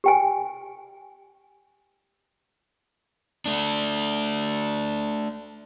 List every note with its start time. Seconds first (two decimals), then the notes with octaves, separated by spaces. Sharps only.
0.04 G4 G5 G#5
3.46 A3 D4